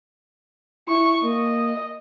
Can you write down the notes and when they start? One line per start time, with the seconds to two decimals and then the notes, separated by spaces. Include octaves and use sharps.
0.88 E4 C#6
1.23 A#3 D#5